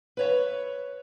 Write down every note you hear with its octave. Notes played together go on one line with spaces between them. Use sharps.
B4 C#5 E5